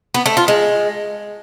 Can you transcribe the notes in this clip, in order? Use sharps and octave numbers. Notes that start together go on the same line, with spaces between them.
B3
A3
F4
G#3